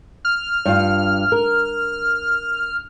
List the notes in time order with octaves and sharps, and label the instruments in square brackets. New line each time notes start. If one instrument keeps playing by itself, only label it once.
[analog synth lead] F6
[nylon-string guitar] G2 F4
A#4